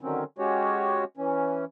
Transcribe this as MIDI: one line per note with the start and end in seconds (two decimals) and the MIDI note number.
0.01 0.24 50
0.01 0.24 51
0.01 0.24 54
0.01 0.24 60
0.01 0.24 61
0.38 1.04 56
0.38 1.04 61
0.38 1.04 66
0.38 1.04 67
0.38 1.04 73
1.17 1.65 52
1.17 1.65 61